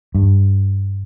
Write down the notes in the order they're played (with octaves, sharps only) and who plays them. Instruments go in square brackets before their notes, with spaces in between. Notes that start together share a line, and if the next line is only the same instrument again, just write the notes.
[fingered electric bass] G2